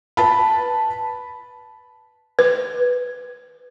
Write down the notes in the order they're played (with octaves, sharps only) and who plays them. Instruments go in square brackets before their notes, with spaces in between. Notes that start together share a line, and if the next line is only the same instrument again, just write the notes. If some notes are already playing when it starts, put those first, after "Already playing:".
[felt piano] B4 A5 B5
[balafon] B4